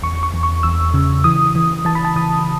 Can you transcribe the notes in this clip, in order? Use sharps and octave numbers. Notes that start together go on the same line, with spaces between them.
E2 C#6
C#6
E2
C#6
E2 E6
C#3
E3 D#6
E3
E3 A5
B5
A5
E3 D#6